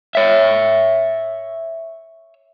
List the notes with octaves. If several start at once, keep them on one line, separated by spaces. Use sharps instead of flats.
C#5 E5